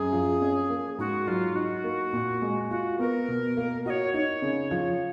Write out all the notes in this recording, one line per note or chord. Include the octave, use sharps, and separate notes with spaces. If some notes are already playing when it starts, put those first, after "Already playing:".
Already playing: F#2 G#4
F3
C#4
A#3
G#2 F#4
F#3 F4
D#4 F#4
A#3
A#2
G#3
F4 F#4
B3 A#4
B2
A#3
F#4 C#5 D#5
D#4 C#5
C#3
F3